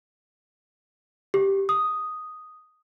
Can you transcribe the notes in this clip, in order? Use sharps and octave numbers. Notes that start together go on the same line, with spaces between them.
G4
D#6